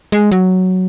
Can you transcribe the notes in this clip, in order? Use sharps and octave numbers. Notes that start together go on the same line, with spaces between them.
G#3
F#3